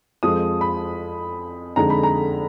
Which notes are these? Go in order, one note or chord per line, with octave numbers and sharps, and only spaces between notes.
F2 F3 G#3 D#6
B5
F2 D3 G#3 D#4 A#5
B5
A#5